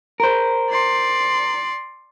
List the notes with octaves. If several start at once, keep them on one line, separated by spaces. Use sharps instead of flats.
A#4 C5
D5 C6